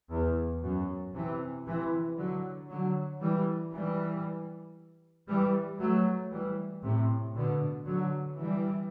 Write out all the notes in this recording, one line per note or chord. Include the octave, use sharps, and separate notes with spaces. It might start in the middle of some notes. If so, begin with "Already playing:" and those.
E2
F#2
C3 E3
C3 E3
D3 F#3
D3 F#3
E3 G3
E3 G3
E3 G3
F#3 A3
E3 G3
A2 C3
B2 D3
D3 F#3
E3 G3